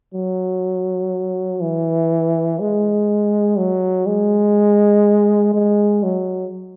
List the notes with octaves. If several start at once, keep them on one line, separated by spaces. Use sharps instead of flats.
F#3
E3
G#3
F#3
G#3
G#3
F#3